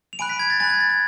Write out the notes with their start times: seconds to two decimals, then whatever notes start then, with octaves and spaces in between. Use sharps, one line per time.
0.13 F7
0.19 G#5 B5 F#6 D7
0.29 B6
0.39 G#6
0.50 A6
0.60 G#5 B5 F#6 A6
0.70 G#6
0.80 A6
0.90 G#6